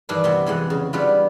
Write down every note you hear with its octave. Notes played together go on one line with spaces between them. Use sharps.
G2 D#3 E3 D4 B4
C3 B3 C4 E4
F2 E3 G#3 F#5 G#5
C#3
G3 B3 D4 E4 F4 B4